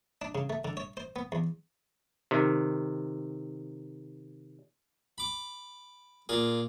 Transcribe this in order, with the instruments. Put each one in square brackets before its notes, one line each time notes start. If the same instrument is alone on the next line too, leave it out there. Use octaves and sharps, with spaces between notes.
[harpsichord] D4
C#3
A3
D3
C#5
C5
B3
E2
[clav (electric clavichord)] C3 D#3
[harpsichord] B5 D6
A#2 F4 G#4